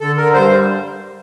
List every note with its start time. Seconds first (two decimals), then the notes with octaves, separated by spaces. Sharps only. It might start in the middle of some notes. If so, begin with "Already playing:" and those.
0.01 D3 A4
0.17 D3 A#4
0.33 G2 C5
0.50 G3